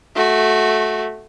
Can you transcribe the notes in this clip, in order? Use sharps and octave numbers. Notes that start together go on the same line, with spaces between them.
A3 F#4